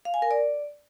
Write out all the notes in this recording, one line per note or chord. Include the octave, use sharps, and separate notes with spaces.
F5
G#5
A#4
D5